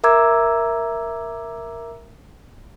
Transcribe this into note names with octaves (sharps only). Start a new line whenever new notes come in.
A#4 E5 A#5 D6 E6 G#6